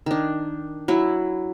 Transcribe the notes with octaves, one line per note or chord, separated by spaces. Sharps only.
D#3 D4
F#3 E4